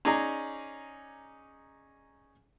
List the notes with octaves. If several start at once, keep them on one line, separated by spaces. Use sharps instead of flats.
C#4 D#4 G#4 D5 G#5 A#5